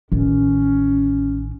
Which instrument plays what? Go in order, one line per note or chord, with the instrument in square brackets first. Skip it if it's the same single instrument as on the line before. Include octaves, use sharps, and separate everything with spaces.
[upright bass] A1 D#3 [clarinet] C#4